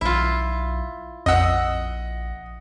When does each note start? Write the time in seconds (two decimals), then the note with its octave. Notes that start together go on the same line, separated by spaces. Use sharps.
0.01 B1 E4 F4
1.26 A#1 F2 D#5 F#5 E6